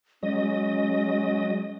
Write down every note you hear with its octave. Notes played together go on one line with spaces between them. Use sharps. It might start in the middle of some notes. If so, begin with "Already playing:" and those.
F#3 G#3 C#4 D#5